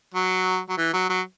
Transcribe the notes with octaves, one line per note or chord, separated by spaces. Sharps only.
F#3
F#3
E3
F#3
F#3